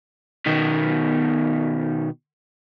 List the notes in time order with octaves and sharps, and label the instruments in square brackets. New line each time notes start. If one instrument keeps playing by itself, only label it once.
[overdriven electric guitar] B2 D#3